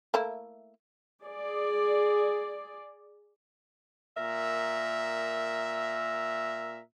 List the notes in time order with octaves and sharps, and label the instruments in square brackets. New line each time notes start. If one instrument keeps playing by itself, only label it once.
[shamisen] A3 A#3 E4
[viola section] G#4 D5
[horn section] A#2 A#4 E5